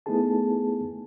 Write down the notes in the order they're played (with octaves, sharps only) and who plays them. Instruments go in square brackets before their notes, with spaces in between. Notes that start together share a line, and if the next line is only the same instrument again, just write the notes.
[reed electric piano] A3 B3 D#4 E4 G#4 A5